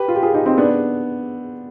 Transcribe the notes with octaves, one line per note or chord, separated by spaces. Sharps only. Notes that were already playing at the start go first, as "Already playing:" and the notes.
Already playing: G4 B4
F4
G4
F4 G#4
D#4 G4
C4 D#4
B3 D4